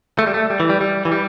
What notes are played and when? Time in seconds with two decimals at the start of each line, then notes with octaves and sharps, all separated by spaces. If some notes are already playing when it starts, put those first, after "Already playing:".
0.19 A3
0.27 G3
0.34 A3
0.50 G3
0.60 E3
0.70 G3
0.81 G3
1.05 E3
1.12 G3